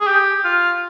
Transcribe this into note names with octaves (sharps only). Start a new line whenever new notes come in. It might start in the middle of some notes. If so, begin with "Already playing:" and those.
G#4
G4
F4